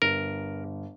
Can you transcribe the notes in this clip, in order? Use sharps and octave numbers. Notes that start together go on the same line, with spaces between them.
G1 A#4